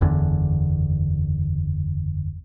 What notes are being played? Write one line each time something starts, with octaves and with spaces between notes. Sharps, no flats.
F#1 E2 D3